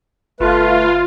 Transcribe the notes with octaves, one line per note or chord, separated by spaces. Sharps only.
G1 A3 F4 B4